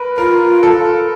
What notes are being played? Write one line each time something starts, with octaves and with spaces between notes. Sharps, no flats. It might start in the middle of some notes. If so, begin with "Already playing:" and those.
Already playing: A#4 B4
F4 A#4
A4